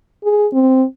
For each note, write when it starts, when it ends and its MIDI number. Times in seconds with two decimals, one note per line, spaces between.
0.24 0.47 68
0.53 0.84 60